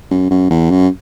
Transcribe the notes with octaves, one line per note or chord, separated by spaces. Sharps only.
F#2
F#2
E2
F#2